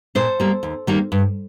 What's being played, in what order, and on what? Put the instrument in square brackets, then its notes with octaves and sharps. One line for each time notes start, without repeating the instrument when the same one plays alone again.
[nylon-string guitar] A#2 A4 C5
G3 A#3
D#2
D#3 G3 A#3
G2